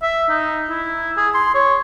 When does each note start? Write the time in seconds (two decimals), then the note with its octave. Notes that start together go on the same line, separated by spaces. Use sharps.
0.03 E5
0.30 D#4
0.70 E4
1.17 G#4
1.34 C6
1.55 C#5